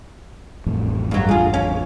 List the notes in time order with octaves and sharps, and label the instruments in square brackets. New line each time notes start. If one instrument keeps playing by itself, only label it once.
[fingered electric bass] A1 F2 A2
[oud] G2 F#3
F4 G#4
C#4